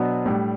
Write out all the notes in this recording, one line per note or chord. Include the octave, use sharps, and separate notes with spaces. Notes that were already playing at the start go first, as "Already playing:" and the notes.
Already playing: B2 F#3 B3 D4
A2 G3 D4